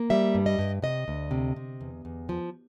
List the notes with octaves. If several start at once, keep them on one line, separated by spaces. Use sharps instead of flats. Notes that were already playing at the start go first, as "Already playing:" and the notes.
Already playing: A#3
G3 E5
G2
D#5
G2
C3 D#5
D2
C3
C3
E2
E2
F3